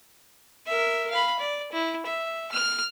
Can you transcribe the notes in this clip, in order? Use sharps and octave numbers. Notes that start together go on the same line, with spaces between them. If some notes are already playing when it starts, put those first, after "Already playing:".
A#4 E5
F5 B5
D5
E4
E5
F6